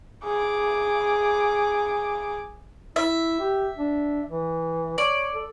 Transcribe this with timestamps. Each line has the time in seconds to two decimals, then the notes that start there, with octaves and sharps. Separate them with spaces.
0.24 G#4 D6
2.96 E4 E5
3.40 G4
3.78 D4
4.30 E3
4.98 C#5 D5
5.34 A4